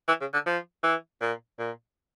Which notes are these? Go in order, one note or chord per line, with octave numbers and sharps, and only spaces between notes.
E3
C#3
D3
F3
E3
A#2
A#2